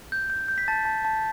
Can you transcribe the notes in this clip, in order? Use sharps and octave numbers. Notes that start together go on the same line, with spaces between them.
G6
G6
G6
B6
A5 A6
A5
A5